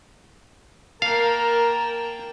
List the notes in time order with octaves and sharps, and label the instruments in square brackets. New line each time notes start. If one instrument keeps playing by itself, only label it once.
[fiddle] A#3 G5 [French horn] A#4 [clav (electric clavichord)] F5 [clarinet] A5